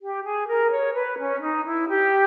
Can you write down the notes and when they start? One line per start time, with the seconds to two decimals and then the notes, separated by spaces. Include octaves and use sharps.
0.01 G4
0.23 G#4
0.47 A#4
0.71 C#5
0.94 B4
1.17 C#4
1.41 D#4
1.65 E4
1.89 G4